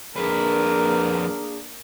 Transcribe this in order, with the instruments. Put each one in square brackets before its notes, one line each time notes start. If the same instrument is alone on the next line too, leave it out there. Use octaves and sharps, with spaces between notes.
[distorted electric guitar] F2 B4 [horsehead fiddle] A#3 D4 [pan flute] G#4 [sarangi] A#4